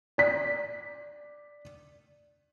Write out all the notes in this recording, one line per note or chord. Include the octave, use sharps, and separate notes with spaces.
D5 B6